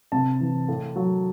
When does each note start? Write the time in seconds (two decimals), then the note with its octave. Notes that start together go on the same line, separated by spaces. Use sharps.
0.12 C3 A5
0.41 E3
0.69 A2
0.96 F#3